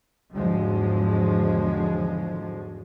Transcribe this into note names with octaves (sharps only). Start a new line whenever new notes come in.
E2 G#2 D3 F3 F#3 G#3